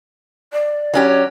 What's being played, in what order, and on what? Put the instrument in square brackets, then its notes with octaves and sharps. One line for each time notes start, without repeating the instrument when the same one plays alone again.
[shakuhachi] D5
[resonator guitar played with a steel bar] F#3 C#4 G4